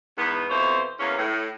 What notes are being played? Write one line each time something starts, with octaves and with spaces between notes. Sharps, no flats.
E2 G#2 B3
F2 B2 E3 C5 C#5
E2 F#3 A#3 C#4
A2